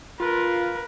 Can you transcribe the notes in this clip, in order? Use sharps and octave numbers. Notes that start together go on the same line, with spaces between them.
F4 A#4 B4